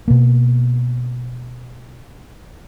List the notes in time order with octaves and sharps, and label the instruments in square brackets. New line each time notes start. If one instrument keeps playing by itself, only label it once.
[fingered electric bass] B2 A#3